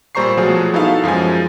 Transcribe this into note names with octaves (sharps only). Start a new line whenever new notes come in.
A#2 G3 C5 A#5 C#6 C7
B2 F3 F#3 A3 G#4
B3 D#4 E4 F#4 A4 F5
F#2 F3 G#3 G#5